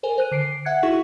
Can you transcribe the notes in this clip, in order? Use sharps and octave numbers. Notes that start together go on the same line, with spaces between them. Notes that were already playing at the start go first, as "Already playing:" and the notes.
A4 A#4 C5 G#5
C5 F#6 D#7
D3 C7 D7
E5 F#5 F#6 G#6 C#7
D#4 E4 F#4 G#4 E5 C#6